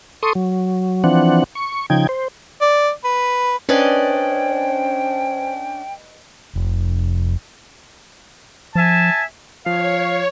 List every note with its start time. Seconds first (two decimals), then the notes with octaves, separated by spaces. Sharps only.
0.23 A4 C6 C#6 D#6
0.35 F#3
1.04 E3 F3 C4 D4 F#5
1.55 C#6
1.90 C#3 F3 D#4 G5 G#6
2.09 C5
2.61 D5
3.04 B4
3.69 C#4 D4 B4 C5 D5 D#5 G5 G#5
6.56 F1
8.75 F3 E5 G#5 A5
9.66 F3 C#5 F5